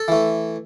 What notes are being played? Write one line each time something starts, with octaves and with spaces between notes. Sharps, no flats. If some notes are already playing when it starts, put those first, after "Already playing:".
Already playing: A4
E3 A3